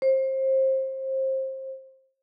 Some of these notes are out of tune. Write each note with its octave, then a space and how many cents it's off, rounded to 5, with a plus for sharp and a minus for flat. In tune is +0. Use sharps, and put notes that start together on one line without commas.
C5 +25